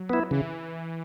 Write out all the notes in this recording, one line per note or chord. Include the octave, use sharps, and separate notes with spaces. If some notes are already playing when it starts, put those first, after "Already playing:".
Already playing: F#3
B3 E4
C#3 E3